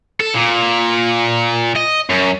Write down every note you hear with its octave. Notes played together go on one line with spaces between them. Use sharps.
A4
A#2
D#5
F#2